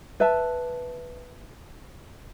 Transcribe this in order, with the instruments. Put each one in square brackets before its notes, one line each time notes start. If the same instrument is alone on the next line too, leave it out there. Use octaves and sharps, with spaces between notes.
[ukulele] B4 E5 A5